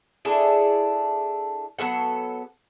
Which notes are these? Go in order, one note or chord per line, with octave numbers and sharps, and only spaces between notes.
D4 E4 G#4 A4
F#3 B3 A4 F#5